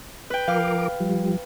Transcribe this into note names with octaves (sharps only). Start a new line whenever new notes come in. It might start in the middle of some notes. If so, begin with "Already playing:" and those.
B4 G5
F3 A#4 F5 D6
F3 G3